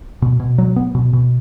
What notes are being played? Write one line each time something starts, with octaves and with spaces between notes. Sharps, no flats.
B2
B2
F#3
B3
B2
B2